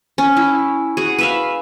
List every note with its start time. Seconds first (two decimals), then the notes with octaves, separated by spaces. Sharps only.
0.18 C#4
0.37 E4
0.97 F#4 G#4
1.19 B4 E5 F5